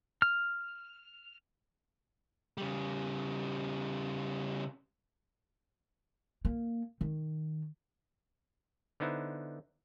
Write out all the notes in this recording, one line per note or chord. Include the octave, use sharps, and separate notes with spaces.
F6
C#3 G3
A#3
D#3
D3 B3 D#4 E4 C5